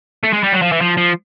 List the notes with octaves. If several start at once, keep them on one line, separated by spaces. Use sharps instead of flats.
A3
G#3
G3
F#3
F3
E3
F3
F3